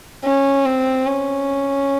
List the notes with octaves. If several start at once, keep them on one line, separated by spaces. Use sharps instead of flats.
C#4
C4
C#4